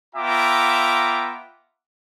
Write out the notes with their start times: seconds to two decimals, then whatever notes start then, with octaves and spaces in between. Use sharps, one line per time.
0.15 B3 F4 E5 G5 A#5 D6